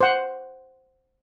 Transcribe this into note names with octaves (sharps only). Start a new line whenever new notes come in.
C5 F#5